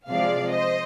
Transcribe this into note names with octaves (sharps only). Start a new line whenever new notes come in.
C3 F3 G#3 D5 F5
C5 D#5